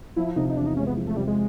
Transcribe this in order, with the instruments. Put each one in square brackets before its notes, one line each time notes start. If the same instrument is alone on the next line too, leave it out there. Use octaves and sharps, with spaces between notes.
[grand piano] F3 [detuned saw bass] E4
[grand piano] C3 [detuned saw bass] D#4
[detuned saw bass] D#4
[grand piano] E2 [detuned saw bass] D4
[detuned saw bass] D#4
[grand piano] G#3 [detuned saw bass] C#4
[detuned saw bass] B3
[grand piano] F3
[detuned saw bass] A3
[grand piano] C3 [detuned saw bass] G3
[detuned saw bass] G#3